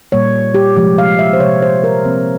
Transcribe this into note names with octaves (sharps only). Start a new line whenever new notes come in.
A#2 G3 A#3 C#5
G4
C3 F3 G#3 G4
F5
E5
C5
C3 F3 G#3 C#5
C5
A#4
C3 F3 A#3 C4